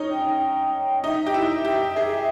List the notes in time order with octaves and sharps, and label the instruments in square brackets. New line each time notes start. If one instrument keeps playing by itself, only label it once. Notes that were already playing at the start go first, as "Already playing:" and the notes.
Already playing: [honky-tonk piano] C#4 D#4
[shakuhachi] G5
[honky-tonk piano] D#4 [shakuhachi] E5
[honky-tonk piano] G4
E4
G4
G#4